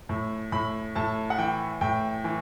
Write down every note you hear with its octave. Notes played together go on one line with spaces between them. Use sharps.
A2
A2 B5
A2 A5
F#5
E3 G5
A2 G5
E3